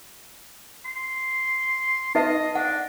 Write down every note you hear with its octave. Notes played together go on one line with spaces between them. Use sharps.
C6
D#4 B4 D#5 E5
D4 F#5